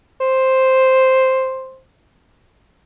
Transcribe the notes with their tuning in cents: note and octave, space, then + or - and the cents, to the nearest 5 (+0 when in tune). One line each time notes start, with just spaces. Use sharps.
C5 +0